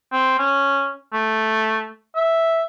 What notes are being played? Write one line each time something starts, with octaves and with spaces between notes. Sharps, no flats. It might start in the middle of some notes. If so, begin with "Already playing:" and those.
C4
C#4
A3
E5